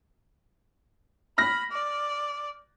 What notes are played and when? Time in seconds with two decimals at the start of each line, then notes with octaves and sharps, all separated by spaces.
1.38 B5 F6 A#6
1.71 D5